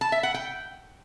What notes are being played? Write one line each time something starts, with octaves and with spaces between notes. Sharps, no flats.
A5
E5
F#5
G5